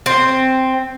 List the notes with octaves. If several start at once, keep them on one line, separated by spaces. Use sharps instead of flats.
C4